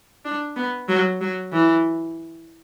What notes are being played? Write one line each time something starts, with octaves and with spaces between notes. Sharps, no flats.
D4
B3
F#3
F#3
E3